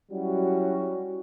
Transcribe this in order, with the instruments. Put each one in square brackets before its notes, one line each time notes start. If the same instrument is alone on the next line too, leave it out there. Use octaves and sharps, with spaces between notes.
[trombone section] F#3 G3 C#4 E4 F#4